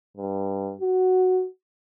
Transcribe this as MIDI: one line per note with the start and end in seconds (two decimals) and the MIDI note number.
0.17 0.74 43
0.81 1.46 66